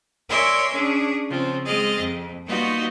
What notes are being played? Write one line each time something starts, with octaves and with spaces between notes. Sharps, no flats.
A#4 C#5 D5 E5 G#5 C6
C#4 D4 G#4
C#3 F3 C4
G#3 C4 G#4 D#5 F6 A6
F2
G3 A#3 B3 D#4 F4 F#4